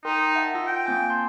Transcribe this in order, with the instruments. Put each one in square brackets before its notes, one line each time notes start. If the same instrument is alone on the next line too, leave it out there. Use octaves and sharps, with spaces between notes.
[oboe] D#4 [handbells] A#4 G5 C6
[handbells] E5 F#5 A5
F4 E6 A#6
[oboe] G5
[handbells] A#3 C4 G#5
A5 C6